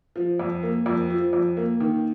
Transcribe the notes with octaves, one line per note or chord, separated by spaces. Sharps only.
F3
F2
A#3
F2
F3
F2
A#3
D#3